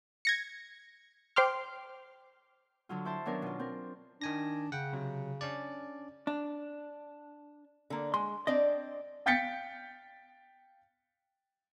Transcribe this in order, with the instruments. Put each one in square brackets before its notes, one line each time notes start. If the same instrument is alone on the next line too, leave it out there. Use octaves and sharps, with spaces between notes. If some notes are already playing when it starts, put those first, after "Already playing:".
[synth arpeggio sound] G#6 A#6 C#7
C5 G5 C6 D6 F6
[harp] D3 F#3 F4
E4 C5 A5
D#3 F#3 B3 C#4 D4 A#4
B2 F4
C4 A#4
[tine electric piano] D#3 G#5 A#6 [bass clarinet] D4
[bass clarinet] C#3 [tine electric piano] F#5 G5
[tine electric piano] C3 F#3
C#4 D4 D5
[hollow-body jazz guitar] D4
[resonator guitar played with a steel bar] D3 A#3
[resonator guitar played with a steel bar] G#3 [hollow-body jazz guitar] C6
[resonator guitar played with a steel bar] C4 D4 D5 [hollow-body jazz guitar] D#5
[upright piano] F5 G5 G6 A6 B6 C#7